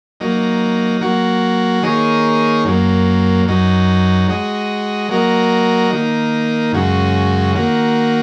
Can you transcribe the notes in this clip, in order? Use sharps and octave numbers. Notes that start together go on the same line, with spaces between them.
F#3 A#3 D#4
F#3 A#3 F#4
D#3 A#3 D#4 G#4 C#5
F#2 F#3 A#3
F#2 F#3 D#4
G#3 F#4 D#5
F#3 A#3 F#4 A#4 D#5
D#3 A#3 D#4
F#2 C#3 G#3 F#4
D#3 A#3 F#4